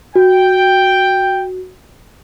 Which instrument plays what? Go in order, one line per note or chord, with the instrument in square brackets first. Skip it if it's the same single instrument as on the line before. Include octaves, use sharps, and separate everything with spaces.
[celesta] F#4 [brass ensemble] G5